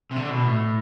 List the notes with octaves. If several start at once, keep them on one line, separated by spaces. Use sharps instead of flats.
C3
D3
B2
A2